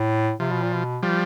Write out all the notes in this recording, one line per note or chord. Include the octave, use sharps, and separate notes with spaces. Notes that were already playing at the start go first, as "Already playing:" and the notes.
Already playing: A2
C3 F3
B2
A#2
B2
F3 G3